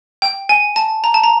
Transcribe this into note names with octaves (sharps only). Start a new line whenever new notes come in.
G5
G#5
A5
A#5
A5
A#5